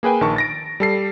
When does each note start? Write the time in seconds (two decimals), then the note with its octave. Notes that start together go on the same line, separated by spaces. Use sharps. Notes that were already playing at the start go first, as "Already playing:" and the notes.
0.03 A#3 G#4 B4 G5 G#5
0.21 A#1 D#3 A5 C#6
0.36 A6 A#6 D7
0.80 G3 A4 C7